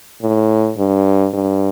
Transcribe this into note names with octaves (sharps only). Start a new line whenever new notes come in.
A2
G2
G2